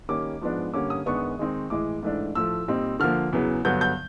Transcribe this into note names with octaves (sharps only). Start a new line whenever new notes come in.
D#3 G3 A#3 C#4 D6
G#2 F3 G#3 B3 D4
G2 D3 G3 A#3 C#4 D6
D#6
F#2 D#3 G#3 B3 D4 C#6
D#3 G#3 C4 D#4
A2 E3 G#3 D6
G#2 E3 A3 D4
A2 F3 A3 E6
A#2 G3 C4 D#4
D3 F3 A#3 F6
E2 C#3 F#3 B3
G2 D3 F#3 B3 G6
G6